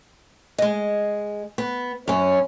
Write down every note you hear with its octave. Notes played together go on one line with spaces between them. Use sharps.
G#3 D#5
B3
F#2 C#4